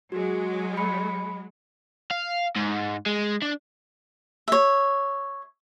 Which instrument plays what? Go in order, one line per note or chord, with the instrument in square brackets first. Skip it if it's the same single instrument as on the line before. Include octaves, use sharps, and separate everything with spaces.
[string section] F#3 G#3 [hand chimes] F#4 G#4
[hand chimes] B5 C#7
[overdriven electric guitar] F5
G#2
G#3
D4
[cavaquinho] C#5 E5